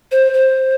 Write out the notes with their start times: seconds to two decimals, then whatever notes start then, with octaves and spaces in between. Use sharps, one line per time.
0.12 C5
0.34 C5